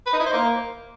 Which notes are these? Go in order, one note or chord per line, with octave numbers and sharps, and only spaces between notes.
B4
D#4
E4
C5
A#3